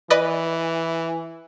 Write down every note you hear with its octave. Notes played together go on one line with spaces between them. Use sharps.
E3 B4 D5 D#5